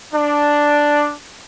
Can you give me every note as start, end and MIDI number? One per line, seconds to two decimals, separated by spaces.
0.13 1.12 62